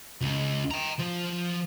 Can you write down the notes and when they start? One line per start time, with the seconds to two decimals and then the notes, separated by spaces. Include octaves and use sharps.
0.22 C#2
0.71 G5 A#5
0.99 F3